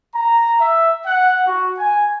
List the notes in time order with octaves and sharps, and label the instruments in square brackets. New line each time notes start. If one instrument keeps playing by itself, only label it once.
[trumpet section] A#5
E5
F#5
F#4
G#5